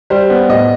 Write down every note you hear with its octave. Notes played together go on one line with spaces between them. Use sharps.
G3 C5
B3
A2 D#5